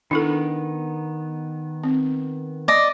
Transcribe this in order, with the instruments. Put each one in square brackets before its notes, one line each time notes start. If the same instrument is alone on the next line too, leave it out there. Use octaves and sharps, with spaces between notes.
[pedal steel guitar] D#3 B3 [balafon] D4 E4 A4
[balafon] C4
[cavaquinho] D5 D#5